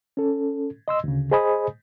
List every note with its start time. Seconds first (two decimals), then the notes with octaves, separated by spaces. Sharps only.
0.17 C#4 A4
0.88 D#5 C6 E6
1.04 D2 C#3
1.31 G#4 C5 D#5 G#5 B5 D#6